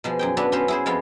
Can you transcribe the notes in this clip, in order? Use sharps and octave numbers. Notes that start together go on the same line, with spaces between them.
B2 F3 G#3
F#2 G#4 G5
B3 D4 F#4 A4 B4
B3 C#4 F#4 B4 C5
E4 G#4 C5
F2 G#3 B3 F4